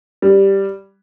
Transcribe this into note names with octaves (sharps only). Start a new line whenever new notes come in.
G3